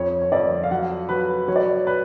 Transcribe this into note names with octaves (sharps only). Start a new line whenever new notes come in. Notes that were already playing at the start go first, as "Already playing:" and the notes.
Already playing: F2 C#5
C#5
F2 D5
F5
F#3 F#5
F#3 B4
F#3 C#5
D5
C#5
B4